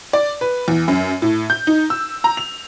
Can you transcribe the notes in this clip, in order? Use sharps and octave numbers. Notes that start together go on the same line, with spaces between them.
D5
B4
E2
F#2
A2
G6
D#4
E6
A#5
F7